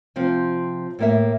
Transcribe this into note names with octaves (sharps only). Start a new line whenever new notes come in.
C3 F3 C4
A2 A#3 E5